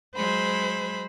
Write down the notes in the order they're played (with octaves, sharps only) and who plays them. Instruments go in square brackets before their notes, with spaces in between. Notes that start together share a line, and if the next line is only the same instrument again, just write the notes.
[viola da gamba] F#3 G#3 [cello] C5 [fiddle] B5